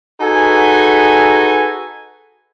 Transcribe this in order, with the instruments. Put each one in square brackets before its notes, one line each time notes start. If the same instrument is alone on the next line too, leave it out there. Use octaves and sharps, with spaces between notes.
[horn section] D#4 F#4 G#4 A4 B4 G#5